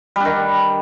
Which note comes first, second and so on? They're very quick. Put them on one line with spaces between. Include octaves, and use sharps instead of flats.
G3 D4 D#3